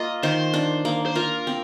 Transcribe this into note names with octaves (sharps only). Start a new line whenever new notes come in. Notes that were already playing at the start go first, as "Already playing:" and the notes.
Already playing: A#3 F4 D#5
D#3 C5
D4
A#3
C5
F4 A#4
C4